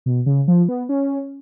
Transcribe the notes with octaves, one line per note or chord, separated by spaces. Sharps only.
B2
C#3
F3
B3
C#4